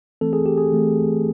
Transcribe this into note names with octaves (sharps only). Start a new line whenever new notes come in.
E3 A3 C4 A4
G#4
G4
G#4
E3 A3 C4